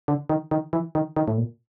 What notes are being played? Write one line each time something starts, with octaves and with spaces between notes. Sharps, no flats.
D3
D#3
D#3
E3
D#3
D#3
A2
A#2